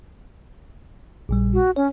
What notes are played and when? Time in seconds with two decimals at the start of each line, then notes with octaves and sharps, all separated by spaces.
1.29 A#1 A#2 G3
1.53 F#4
1.76 C#4 C#5